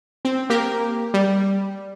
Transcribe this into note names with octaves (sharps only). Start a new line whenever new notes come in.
C4
A#3 G4 A#4
G3